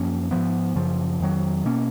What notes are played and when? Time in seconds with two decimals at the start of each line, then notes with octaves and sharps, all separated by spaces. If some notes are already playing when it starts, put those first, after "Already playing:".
Already playing: F#2 F3 A#3 C#4
0.31 G#2 F3 B3
0.76 F#2 C#3 F3
1.20 F2 D#3 F#3
1.65 B2 A#3 C#4